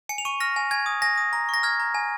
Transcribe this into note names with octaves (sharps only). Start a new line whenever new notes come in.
G#5 C#7
F7
C#6 D#7
F6 A#6
G#5
G#5 G#6
D#6
G#5 A#6
D#6
A#5
C#6 A#6
F6 G#6
A#5
G#5